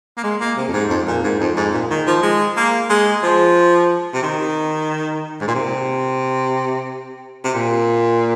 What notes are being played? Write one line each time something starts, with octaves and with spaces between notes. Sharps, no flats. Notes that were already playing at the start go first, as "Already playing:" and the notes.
A#3
G#3
A#3
C3
F2
G#2
F2
A#2
G#2
F2
G#2
A#2
D#3
F3
G#3
A#3
G#3
F3
C3
D#3
G#2
A#2
C3
C3
A#2